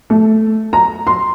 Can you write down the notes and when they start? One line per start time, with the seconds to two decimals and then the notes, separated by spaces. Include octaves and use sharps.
0.10 A3
0.73 A#5
1.07 C6